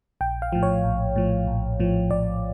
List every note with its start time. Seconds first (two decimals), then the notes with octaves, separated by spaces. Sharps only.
0.21 A#1 G5
0.42 F5
0.53 A2 F3
0.63 C#5
0.84 A#1
1.16 A2 F3
1.48 A#1
1.80 A2 F3
2.11 A#1 D5